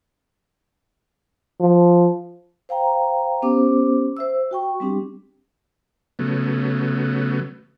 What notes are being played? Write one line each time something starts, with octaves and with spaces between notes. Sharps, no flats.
F3
C5 F5 G5 A#5
B3 C#4 G4 C5 D6
C5 E5 E6
F#4 G5 C#6
G3 C4 D4 G4
C#3 F#3 A3 B3